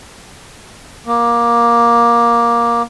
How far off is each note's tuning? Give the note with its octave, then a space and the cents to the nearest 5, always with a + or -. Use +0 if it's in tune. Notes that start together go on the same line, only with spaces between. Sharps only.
A#3 +15